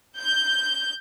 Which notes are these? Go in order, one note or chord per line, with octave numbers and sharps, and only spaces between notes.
G6